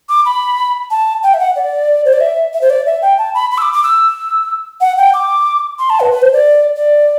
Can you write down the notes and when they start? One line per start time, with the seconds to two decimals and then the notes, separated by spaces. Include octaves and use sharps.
0.09 D6
0.26 B5
0.91 A5
1.23 G5
1.34 E5
1.39 F#5
1.56 D5
2.05 C5
2.13 D5
2.21 E5
2.54 E5
2.61 C5
2.70 D5
2.86 E5
3.02 G5
3.18 A5
3.34 B5
3.51 B5
3.58 E6
3.62 D6
3.73 D6
3.83 E6
4.81 F#5
4.98 G5
5.14 D6
5.79 C6
5.90 A5
6.00 B4
6.12 B4
6.22 C5
6.33 D5
6.76 D5